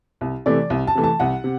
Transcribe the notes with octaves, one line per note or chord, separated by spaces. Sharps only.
C2
C3 E3 A3 D5
C2
A5
C3 E3 A3
A5
C2 F#5
C3